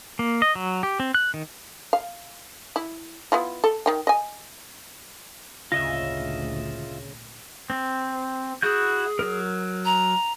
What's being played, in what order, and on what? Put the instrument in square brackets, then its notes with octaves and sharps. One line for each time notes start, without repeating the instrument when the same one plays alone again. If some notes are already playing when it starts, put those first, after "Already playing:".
[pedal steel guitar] A#3
D#5
F#3
G4
C4
F#6
D#3
[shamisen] F5
E4
B3 E4 F4
A4
D#3 G5
D#5 G#5
[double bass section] G#1 D2 A#2 [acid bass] C#3 [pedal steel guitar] F4 D#5 E5 [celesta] A#6
[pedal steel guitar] C4
[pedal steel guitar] E4 F#4 G6 [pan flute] G#4
[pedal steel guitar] F#3 A#4
[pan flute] A#5